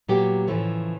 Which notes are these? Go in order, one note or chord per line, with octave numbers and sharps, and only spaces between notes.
A#2 F#3 B3 G4
A2 C#3 E3 F3 A3